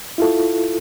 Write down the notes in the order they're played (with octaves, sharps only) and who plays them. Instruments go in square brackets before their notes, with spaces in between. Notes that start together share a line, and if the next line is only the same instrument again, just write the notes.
[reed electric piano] E4 F4 A4